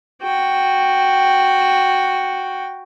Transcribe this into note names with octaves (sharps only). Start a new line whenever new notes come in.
F#4 G5